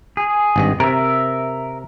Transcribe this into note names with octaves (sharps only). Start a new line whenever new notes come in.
G#4
G#1 G2 D#5
C3 A#4 E5